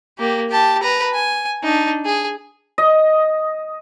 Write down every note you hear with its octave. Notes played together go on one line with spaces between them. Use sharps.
A#3 G4
G4 A5
B4 A#5
G#5
D4 D#4
G#4
D#5